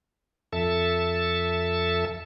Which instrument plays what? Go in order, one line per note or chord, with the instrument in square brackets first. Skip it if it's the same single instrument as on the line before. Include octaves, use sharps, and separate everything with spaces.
[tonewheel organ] F2 A4 E5 A5